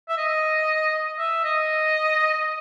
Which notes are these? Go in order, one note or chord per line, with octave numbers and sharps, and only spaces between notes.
E5
D#5
E5
D#5